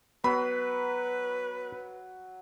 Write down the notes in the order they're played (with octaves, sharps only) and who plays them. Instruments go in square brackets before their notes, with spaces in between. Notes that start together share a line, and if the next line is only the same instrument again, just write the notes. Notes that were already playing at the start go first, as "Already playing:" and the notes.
[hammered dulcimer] F#3 [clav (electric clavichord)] B3 [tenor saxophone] B4 [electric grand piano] B5